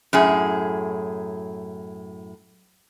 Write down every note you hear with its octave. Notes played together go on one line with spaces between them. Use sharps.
F#2 A2 G#4